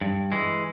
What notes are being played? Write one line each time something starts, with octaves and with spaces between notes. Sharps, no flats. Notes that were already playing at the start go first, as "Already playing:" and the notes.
G2
E3 G#3